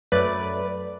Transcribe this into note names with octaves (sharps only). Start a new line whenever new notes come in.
F#2 F#3 A3 B4 D5